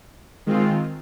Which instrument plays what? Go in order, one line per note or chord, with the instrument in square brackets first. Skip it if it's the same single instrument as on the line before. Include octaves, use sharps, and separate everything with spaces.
[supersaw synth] D#3 G#3 C4 F4